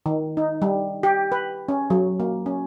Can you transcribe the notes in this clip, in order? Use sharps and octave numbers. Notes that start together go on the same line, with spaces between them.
D#3
D#4
G3
G4
B4
C#4
F#3
A#3
C#4